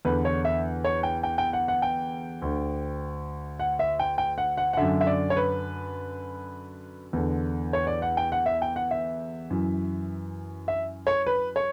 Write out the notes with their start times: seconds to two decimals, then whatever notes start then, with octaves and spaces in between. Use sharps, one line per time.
0.05 E2 D3 B4
0.25 C#5
0.45 E5
0.85 C#5
1.03 G5
1.23 G5
1.38 G5
1.53 F#5
1.68 F#5
1.82 G5
2.42 D2 D3
3.60 F#5
3.79 E5
3.99 G5
4.18 G5
4.38 F#5
4.57 F#5
4.73 F#5
4.77 F#2 D3 E5
5.01 E5
5.07 D5
5.30 C#5
5.37 B4
7.13 E2 D3
7.73 C#5
7.87 D5
8.02 F#5
8.17 G5
8.32 F#5
8.46 E5
8.62 G5
8.76 F#5
8.91 E5
9.50 F#2 E3
10.68 E5
11.07 C#5
11.26 B4
11.56 C#5